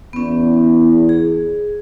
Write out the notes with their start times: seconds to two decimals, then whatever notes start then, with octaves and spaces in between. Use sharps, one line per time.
0.13 E2 B3 C#4
1.09 G#4